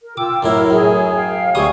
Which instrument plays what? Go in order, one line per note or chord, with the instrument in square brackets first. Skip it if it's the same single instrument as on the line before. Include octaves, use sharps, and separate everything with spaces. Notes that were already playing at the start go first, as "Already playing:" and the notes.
[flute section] A#4
[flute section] F4 G5 E6 [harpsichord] D6
[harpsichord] F#2 A2 E4 [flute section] A#4
[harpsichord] F#2 [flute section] G#4 C#5
[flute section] F5 G5
[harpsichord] D2 G3 D#6 [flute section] G#4 C#6